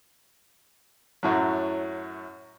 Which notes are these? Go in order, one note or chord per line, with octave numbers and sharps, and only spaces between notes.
F#2 A2 F#3